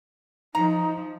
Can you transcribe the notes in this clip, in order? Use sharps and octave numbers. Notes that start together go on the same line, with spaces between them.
F3 D#4 A#5